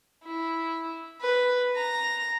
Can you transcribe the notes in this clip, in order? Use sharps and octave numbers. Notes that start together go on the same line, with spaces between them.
E4
B4
A#5